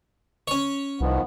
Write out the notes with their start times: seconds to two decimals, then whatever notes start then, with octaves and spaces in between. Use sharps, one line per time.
0.48 C#4 C#5
1.01 C2 D#3 F3 B3